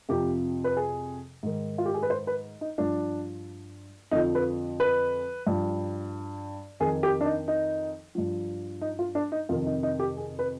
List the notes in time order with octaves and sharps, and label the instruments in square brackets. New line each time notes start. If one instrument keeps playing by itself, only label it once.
[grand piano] F2 C3 F3 G4
B4
G#4
G#2 D#3
F4
G4
G#4
B4
C5
B4
D#4
G2 F3 D4
F2 D3 F3 D#4
B4
B4
G2 F3
F2 D#3 G#4
G4
D4
D#4
D#4
G2 F3
D#4
F4
D4
D#4
F2 C3 D#3 F4
D#4
D#4
G4
G#4
B4